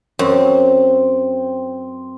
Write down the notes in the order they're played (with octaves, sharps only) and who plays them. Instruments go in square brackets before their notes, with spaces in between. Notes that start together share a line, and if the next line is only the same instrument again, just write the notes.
[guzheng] F#2 [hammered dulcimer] C4